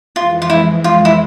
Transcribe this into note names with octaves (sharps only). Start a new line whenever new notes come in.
F2 E3 G#3 F4
F4
E4
F4
E4